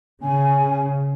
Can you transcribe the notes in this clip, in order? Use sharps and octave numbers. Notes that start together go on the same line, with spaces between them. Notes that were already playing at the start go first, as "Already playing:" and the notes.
C#3 G#5